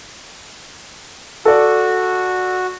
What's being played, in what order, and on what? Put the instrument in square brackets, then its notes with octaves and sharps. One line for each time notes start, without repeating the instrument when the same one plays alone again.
[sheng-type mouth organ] F#4 [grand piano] A4 D5